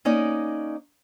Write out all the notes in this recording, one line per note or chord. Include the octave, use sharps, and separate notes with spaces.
A#3 C#4 D#4 D5